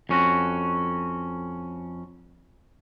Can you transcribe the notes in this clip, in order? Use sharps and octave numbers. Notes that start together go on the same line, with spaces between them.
F2 C#4 F#4